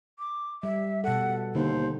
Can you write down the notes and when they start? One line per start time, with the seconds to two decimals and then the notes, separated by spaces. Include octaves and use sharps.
0.19 D6
0.63 G3 E5
1.04 B2 A4 F#5
1.55 D#2 D3 C5